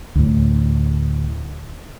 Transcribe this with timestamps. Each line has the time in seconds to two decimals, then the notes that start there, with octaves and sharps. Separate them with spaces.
0.15 D2 A2